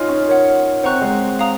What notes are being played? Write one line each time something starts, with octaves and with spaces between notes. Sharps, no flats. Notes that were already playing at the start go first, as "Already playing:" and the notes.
Already playing: D#4 F4 C#5 G#5 C6 F6
C#4
A#4 C#5 F#5
C4 C5 F#5 A#5 C#6 F#6
G#3
F5 A#5 D#6